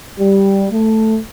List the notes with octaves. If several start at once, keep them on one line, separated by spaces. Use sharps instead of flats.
G3
A3